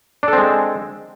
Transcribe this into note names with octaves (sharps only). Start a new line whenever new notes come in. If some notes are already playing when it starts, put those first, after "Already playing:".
G#3 C4 D4 A4